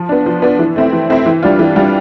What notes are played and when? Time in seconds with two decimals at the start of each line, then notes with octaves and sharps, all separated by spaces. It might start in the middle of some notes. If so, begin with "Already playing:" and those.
Already playing: F3
0.09 B3 D4
0.26 F3
0.42 B3 D4
0.59 E3
0.76 A3 C4 E4
0.93 E3
1.09 A3 C4 E4
1.26 E3
1.42 G3 D4 F4
1.59 E3
1.76 G3 D4 F4